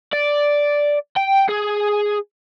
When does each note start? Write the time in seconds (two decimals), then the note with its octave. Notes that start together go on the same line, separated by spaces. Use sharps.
0.13 D5
1.16 G5
1.49 G#4